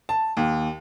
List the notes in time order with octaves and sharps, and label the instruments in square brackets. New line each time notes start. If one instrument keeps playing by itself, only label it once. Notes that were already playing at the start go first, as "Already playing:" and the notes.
[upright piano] A5
D#2